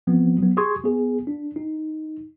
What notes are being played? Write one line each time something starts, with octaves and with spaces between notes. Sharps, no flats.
E3 F3 B3 C4
F#3 B3
G4 G#4 C6 C#6 D#6 G#6
B3 G#4
D4
D#4